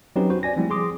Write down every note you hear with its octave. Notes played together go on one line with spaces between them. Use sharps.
F#3 C4 C#4 D#4 G4 B4
F#4 C5
D5 G#5 A#6
F3 G3 A3 C4 E4
G#4 C6 D6 D#6